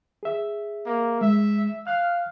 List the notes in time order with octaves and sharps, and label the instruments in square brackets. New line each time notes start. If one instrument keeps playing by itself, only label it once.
[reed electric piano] G#4 E5
[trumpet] A#3
[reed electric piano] G#3 [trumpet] E5
[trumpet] F5 [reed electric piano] F6 F#6